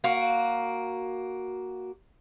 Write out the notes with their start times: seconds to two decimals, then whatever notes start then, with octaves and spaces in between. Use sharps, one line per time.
0.04 A#3 F#4